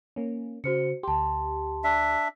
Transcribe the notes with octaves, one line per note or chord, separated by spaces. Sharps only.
A#3 C#4
C#3 F#4 C5 C#7
D2 G4 A5 C6
D4 E5